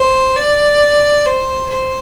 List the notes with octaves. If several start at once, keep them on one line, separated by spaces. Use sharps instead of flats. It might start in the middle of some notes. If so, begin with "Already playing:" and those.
Already playing: C5
D5
C5
C5